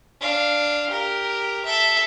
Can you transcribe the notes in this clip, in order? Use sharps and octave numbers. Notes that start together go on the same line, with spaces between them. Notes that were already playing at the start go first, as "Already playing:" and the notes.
D4 F5
G4 A#4
A4 E5